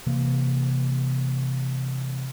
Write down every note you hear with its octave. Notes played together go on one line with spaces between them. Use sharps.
C3 E3 A#3